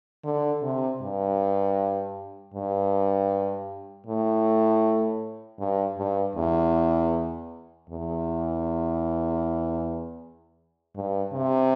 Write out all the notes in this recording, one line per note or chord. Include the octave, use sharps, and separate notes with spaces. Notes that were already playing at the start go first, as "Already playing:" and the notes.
D3
C3
G2
G2
A2
G2
G2
E2
E2
G2
C3